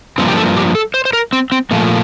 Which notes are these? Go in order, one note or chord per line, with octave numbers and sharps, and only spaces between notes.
G2 F3 A#3 C4
G4
A4
G4
A4
C5
C5
A#4
C4
C4
A#2 F3 A3 A#3